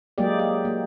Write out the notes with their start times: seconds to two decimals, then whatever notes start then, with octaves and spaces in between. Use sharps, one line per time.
0.18 F#3 G#3 A#3 G4 G#4 D5
0.39 G4
0.65 A#3